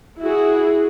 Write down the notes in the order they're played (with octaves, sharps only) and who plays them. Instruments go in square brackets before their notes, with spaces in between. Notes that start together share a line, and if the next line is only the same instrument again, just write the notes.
[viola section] E4 F#4 G#4